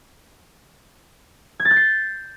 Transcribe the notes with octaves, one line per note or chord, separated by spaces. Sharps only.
G#6
A6
G6
C7